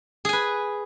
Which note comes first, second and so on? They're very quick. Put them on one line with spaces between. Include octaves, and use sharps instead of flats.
G#4 G#5 B4